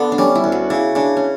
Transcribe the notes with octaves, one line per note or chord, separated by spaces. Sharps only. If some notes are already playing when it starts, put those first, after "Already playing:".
Already playing: D3 B3
D4
G3 C#4
E4
D2
F#4
C#3 E4
C#3 D4
C#4